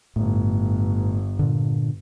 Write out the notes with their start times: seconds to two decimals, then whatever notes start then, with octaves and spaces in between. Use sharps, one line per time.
0.16 G1 A2
1.39 A#2 D3